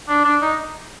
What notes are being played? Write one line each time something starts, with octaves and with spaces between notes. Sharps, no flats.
D4
D4
D#4